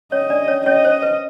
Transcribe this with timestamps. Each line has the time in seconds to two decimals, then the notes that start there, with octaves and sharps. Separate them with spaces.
0.12 C#4 C#5 D#5
0.30 D4 D5
0.48 C#4 C#5
0.66 C#4 C#5 D#5
0.85 C5
1.02 B4